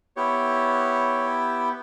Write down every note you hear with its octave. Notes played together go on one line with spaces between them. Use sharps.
B3 E4 G4 C#5